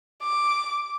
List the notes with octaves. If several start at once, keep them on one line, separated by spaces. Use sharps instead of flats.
D6